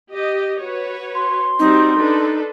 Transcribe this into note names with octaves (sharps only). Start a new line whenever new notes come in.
G4 D#5
F#4 B4 C#5
C6
G3 C4 D#4 F#4
D4 A4 B4